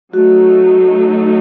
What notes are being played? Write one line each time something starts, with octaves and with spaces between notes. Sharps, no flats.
F#3 A3 D#4 F#4